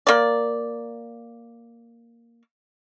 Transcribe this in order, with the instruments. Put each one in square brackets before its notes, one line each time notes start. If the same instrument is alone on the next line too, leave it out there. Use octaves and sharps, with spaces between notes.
[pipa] A#3 D5